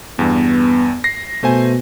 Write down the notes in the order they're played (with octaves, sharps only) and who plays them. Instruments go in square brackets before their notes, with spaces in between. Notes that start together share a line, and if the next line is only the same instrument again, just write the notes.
[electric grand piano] E2 G2 [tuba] B3
[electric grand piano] A#6 C7
[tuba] B2 [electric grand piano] A3 C5 G#5